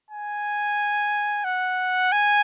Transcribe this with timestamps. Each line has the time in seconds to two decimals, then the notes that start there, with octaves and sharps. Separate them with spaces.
0.10 G#5
1.44 F#5
2.12 G#5